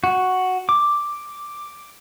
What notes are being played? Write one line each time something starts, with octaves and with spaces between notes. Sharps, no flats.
F#4
D6